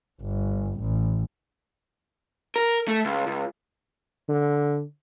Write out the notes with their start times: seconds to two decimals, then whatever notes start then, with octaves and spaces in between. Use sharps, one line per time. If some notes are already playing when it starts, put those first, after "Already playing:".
0.22 G1
0.81 A1
2.56 A#4
2.88 A3
3.05 C#2
3.27 C#2
4.29 D3